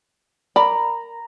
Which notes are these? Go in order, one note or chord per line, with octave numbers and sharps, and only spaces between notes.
A#4 D5 A#5 B5